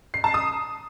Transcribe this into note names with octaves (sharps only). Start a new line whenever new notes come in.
C7
A5
D#6